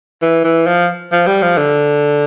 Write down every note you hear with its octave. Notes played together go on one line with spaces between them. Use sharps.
E3
E3
F3
F3
G3
F3
D3